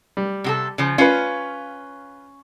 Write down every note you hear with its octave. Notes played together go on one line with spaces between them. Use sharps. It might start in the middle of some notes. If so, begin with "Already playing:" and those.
G3
C3 G4 A4
C#3 F3
C#4 F4 B4 C#5 F5